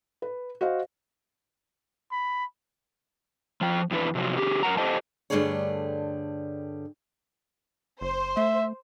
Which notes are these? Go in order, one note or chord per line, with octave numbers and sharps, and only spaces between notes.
B4
F#4 C5 D#5 F5
B5
F3 G5
F2 E3 F#3 D4 B4
C3 F3 F#3
D3 G4 G#4
F#2 A#4 F#5 A#5
G4 A4 C5 D#5 G5 A5
G2 D3 G3 A3 G#4 C#5
F#1 C5
A3 E5